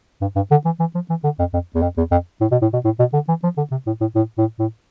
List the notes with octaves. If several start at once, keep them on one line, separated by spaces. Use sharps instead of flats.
G2
G2
D3
E3
E3
F3
E3
D3
F2
F2
E2
F2
E2
F2
A2
B2
A2
B2
A2
B2
D3
E3
F3
D3
C3
A2
A2
A2
A2
A2